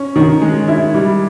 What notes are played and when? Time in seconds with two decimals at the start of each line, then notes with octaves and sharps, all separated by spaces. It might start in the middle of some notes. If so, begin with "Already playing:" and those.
Already playing: C#4
0.16 D#3
0.42 G#3
0.68 E4
0.94 G3